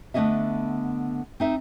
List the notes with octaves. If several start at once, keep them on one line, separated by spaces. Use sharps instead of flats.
D3 A3 B3 C#4 D#5 E5
C4 D#4 E5